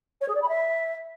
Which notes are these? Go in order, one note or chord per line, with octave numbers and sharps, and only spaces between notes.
C#5
G#4
D5
B5
E5